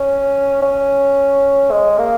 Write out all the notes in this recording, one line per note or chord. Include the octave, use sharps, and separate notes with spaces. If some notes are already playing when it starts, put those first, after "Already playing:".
Already playing: C#4
C#4
G#3
A#3